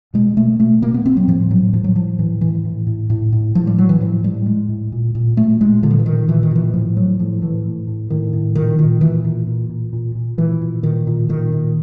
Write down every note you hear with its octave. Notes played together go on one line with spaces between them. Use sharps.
B2 G#3
B2 A3
B2 A3
B2 A#3
B3
B2 C4
F#3
A2 F3
A2 F#3
A2 F3
F#3
A2 F3
A2 E3
A2 E3
A2
A2
A2
A2
A2 F3
G3
A2 F#3
E3
A2 F3
A2 G3
A2 G#3
A2
A#2
A#2
A#2 A3
A#2 G#3
A#2 D3
F3
E3
A#2 D#3
A#2 E3
D#3
A#2 E3
A2 F3
A2 F#3
A2 F3
A2 E3
A2
A2
A2 D#3
A2
A#2 D#3
A#2 D#3
A#2 E3
A#2
A#2
A#2
A#2
A#2
A#2 E3
A#2
A#2 D#3
A#2
A#2 D#3
A#2